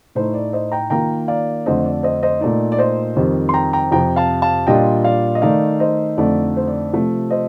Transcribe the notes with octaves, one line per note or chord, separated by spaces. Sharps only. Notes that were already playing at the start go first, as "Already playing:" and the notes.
A2 A3 D#4 C5
D5
C5 D#5
G5 A#5
D#3 A#3 F4 G5 A#5
D5 F5
F2 D3 A3 D4 C5 D#5
D5
C5 D#5
C5 D#5
A#2 A3 D#4 D5
D5
C5 D#5
F2 D#3 G3 C4
C6
G5 A#5
G5 A#5
F2 C3 F3 G5 A#5
F5 A5
F5 A5
A#2 G3 D4 F4 D#5 G5
D5 F5
D#5
D#3 A3 D#4 D5 F5
C5 D#5
F2 D3 A3 D#4 D5
C5
D5
C3 F3 A3
C5 D#5